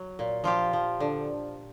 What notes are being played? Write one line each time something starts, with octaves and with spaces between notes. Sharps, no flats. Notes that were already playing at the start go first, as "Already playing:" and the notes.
Already playing: F#3
A#2
F3 F4 G4
F3
D3